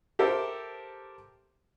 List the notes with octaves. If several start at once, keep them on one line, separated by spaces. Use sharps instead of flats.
G4 A4 A#4 C5 E5